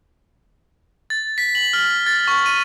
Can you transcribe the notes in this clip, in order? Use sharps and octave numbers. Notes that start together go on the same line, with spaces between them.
A6
B6
F#7
F6
A6
C#6
D#7